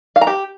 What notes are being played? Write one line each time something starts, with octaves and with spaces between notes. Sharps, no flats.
F5
A#5
G4